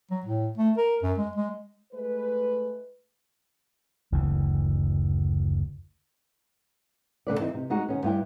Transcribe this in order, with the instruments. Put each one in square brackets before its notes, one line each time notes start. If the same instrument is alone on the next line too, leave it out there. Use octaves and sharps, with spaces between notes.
[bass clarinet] F#3
A2
A3
A#4
F#2
G#3
G#3
[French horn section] G#3 A3 B4
[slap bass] F#1 D2 E3
[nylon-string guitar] D3 B3 B4 D5
E3 C4 D#4
C3
G3 G#3 D#4 F#4
D#3 B3 C#4
G2 B3 E4 G5